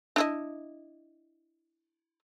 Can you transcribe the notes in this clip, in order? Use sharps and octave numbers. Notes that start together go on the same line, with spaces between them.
D4 E4 D#5